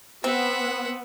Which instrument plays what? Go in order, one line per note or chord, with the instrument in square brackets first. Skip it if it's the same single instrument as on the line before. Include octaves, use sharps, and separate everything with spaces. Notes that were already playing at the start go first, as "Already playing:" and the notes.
[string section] B3 [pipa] C4 [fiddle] E5 F#5